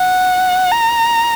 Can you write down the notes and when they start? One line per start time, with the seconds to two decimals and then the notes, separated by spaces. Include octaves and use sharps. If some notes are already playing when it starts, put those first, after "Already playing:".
Already playing: F#5
0.71 A#5